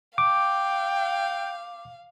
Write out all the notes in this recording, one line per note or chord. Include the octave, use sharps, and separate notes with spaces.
F5 G5 D6